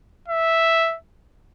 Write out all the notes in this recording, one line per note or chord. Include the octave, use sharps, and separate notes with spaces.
E5